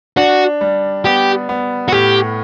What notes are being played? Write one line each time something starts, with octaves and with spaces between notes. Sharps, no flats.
D4 F#4
G3
B3 G4
B3
F#4
A2 G4